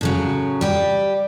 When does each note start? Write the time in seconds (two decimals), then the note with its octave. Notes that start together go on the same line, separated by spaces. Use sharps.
0.01 A2 C#3 F#3
0.61 G3 G4